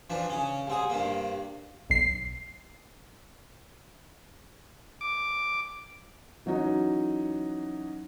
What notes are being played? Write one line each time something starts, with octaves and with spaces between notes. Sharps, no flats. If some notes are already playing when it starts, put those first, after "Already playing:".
E3 F3 D4
C#3 C#4
C2 C4 G#4
G2 C3 A#3
B1 C7
D6
E3 F#3 C#4 D#4 F#4